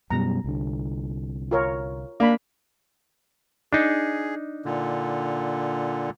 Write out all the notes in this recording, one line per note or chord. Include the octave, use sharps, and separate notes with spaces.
F#2 B2 G3 A#5
C2 D3
F4 A#4 C#5
A#3 D4 B5
D4 D#4 G#4
A#2 D3